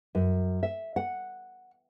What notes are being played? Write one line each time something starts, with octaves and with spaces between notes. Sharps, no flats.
F#2
E5
F#5